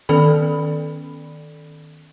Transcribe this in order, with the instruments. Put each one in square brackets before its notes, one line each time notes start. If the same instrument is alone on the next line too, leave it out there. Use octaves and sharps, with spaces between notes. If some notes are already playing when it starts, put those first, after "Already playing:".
[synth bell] D#3 B3 C#4 A4 D5 B5